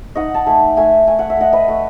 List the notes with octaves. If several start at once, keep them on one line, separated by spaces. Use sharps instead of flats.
D#4 D#5 F#5
A5
A3 E5 G#5
A3 E5 G#5
A3 G#5
F#5
E5
A3 D#5 F#5
B4 D#5
A3